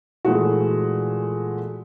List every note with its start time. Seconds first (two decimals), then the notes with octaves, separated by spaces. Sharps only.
0.25 A#2 E3 G#3 A3 F#4